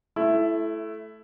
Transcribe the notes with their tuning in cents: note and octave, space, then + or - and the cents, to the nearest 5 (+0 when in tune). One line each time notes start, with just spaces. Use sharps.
A3 -15 E4 +15